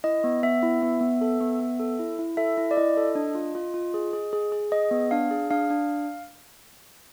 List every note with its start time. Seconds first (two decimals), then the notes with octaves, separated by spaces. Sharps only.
0.04 E4 D#5
0.24 B3
0.43 B3 E5
0.63 E4
0.82 B3
1.01 B3
1.21 A4
1.40 B3
1.60 B3
1.80 A4
1.99 E4
2.19 E4
2.37 A4 E5
2.57 E4
2.71 D5
2.77 E4 D#5
2.97 A4
3.15 D4
3.35 F4
3.55 F4
3.74 F4
3.94 G#4
4.13 G#4
4.33 G#4
4.52 G#4
4.72 G#4 D#5
4.91 B3
5.11 D4 F5
5.31 G#4
5.51 D4 F5
5.70 D4